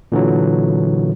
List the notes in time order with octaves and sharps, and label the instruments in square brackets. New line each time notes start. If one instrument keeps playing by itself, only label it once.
[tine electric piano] A#2 D3 E3 F#3